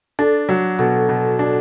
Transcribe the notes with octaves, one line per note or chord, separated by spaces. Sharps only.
D4 A4
F#3
B2 A4
B2
D4